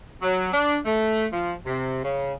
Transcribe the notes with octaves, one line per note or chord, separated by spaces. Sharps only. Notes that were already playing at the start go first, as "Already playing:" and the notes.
F#3
D4
A3
F3
C3
C#3